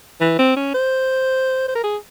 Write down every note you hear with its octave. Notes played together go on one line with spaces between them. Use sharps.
E3
C4
C#4
C5
C5
A#4
G#4